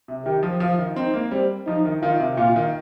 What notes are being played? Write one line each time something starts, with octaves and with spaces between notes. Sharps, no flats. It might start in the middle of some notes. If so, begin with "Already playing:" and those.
C3
D#3 G4
F3
F3 F4
D#3
C4 D#4
A#3
G3 C4
F3 D#4
D#3
D#3 F4
C3
A#2 F4
D#3